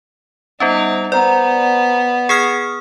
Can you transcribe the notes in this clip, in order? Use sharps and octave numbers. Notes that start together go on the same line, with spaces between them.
G3 B3 C#4 D#4
B3 C5 D5 A#5
G#4 D#6 F6 G#6 C7 C#7